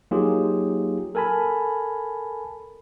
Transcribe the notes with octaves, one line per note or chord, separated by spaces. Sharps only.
F#3 A#3 D#4 F4 G4 G#4
A4 A#4 G#5 A5 B5